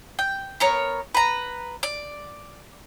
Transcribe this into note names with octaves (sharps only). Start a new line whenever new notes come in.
G5
B3 A#4 C#5
B4 A#5
D5